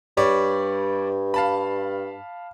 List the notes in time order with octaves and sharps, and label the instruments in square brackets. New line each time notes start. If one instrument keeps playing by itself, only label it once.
[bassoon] G2 [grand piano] G3 C#5 D5
[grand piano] F5 A5 B5